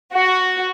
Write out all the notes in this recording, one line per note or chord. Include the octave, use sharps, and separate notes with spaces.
F#4